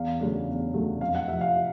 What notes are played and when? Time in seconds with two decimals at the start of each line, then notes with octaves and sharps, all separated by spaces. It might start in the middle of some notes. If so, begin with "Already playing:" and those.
Already playing: E2 F5
0.20 C#3 F#3 A3 D4
0.47 E2
0.74 C#3 F#3 A3 D4
1.01 F2 F5
1.15 F#5
1.28 C3 E5
1.33 F3
1.41 F5